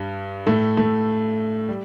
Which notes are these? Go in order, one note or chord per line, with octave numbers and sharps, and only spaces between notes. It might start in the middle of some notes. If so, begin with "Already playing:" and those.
Already playing: G2 G3
A2 A3
A2 A3
G3